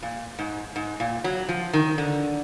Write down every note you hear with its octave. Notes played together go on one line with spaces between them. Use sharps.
A#2
G#2
G#2
A#2
F#3
F3
D#3
D3